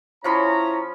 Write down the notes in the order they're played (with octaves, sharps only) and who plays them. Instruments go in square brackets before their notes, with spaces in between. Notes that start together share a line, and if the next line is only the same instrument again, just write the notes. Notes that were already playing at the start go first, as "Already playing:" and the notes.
[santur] F3 C#4 B5 [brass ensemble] E4 C#5 A#5